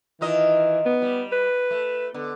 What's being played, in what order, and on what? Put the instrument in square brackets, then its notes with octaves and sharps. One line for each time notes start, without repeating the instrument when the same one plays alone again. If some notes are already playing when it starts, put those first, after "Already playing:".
[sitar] D#3 F4 D#5 [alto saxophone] E3
[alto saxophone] B3
[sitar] G3
[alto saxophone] B4
[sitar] A3
[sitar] D3 [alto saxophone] B3